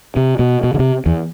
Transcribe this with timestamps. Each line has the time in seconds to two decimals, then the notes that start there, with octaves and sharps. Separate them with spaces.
0.16 C3
0.39 B2
0.64 B2
0.74 D3
0.79 C3
1.06 E2